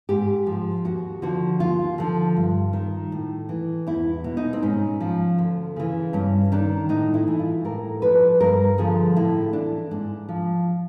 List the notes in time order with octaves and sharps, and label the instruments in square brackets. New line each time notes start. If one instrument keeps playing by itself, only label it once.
[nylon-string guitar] G#2 G4
F3
D#2 F#4
D3 F3 F#4
D#2 F4
D3 F3
G2
D#3
A2
E3
E2 E4
B2
D#4
C4
G#2 C#4
F3
D2
C#3 E3
G2 C#4
D#3 D4
A2 D#4
E4
E3
F4
A2 A#4
F3 B4
G2 A#4
D3 F3 G#4
A2 E4
E3 D4
G#2 D4
F3